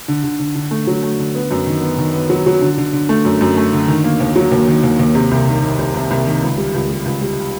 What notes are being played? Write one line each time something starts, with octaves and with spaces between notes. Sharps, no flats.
D3
D3
D3
D3
A3
F#3
A3
D3
B3
F#2
D#3
B3
D#3
B3
F#3
F#3
D3
D3
D3
A3
F#2
F#2
A3
D3
D#3
A#3
D#2
F#3
D#2
D#3
D#2
D#2
C3
C2
D#3
D#3
C2
C2
C2
D#3
C#2
G3
C#2
G3
C#2
G3